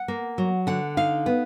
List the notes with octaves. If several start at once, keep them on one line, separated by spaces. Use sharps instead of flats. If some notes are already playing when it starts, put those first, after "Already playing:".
Already playing: F#5
A#3
F#3
D3 F#5
D#4 F5
B3